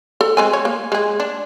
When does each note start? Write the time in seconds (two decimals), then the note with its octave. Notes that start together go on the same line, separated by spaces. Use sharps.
0.21 A4
0.37 G#3 C4 G#5
0.53 C#5
0.65 A#3
0.92 G#3 G#4
1.20 D4